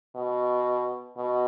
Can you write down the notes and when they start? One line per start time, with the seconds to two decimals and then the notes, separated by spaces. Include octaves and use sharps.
0.16 B2
1.17 B2